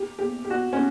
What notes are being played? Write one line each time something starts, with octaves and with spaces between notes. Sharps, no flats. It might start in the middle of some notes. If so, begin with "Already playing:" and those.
Already playing: G4
G4
G4
F#4
C#4